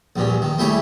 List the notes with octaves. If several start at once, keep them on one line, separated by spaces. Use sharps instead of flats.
A#1 G2 A#2 C#4
D#3
D#2 G3 A3 E4 G#4 C#5